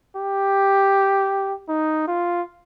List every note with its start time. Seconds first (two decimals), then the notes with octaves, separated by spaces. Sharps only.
0.16 G4
1.68 D#4
2.07 F4